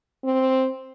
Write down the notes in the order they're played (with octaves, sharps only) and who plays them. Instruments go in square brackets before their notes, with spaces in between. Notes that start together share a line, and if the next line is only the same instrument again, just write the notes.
[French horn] C4